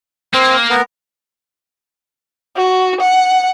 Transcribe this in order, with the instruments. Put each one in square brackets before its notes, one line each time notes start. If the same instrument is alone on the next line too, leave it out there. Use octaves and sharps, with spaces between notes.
[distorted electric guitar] A#3 [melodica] C4
[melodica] B3 A#4
[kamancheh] F#4
F#5